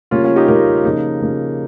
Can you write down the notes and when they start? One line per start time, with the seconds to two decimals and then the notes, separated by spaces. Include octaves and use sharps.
0.11 C#3 G3 A#3 C#4 F4
0.24 C#4 F4
0.36 D#4 G4
0.48 C#3 G3 A#3 G4 A#4
0.84 C#3 F3 A#3 D#4
1.22 C#3 F3 A#3